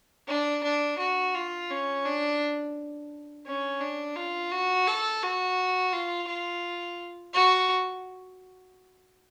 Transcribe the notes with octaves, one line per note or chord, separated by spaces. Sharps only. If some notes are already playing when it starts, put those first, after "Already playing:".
D4
D4
F#4
F4
C#4
D4
C#4
D4
F4
F#4
A4
F#4
F4
F4
F#4